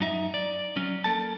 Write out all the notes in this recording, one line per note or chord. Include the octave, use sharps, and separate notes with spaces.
F#2 D#4 E5
D5
F#3 C#4
A#3 A4 A5